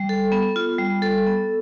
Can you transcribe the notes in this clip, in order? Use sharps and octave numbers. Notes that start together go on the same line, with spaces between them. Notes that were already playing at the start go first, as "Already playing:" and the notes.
Already playing: G3
A4
B3
F4
G3
A4
B3